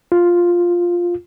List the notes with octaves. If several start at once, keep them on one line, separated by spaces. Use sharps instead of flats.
F4